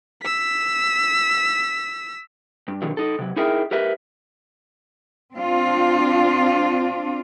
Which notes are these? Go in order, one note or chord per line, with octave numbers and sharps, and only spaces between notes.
E6 B6
G2
B2 D3 D#3 F3 F#3
D#4 A4
C3 F#3
D#4 E4 G#4 A#4 E5 G5
G4 A#4 B4 E5
C4 D4 F4